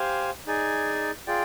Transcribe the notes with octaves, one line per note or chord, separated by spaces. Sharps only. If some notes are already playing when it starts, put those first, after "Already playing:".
Already playing: G4 C5 F5 G#5
D#4 G#4 D5 G#5
F4 G#4 D5 G5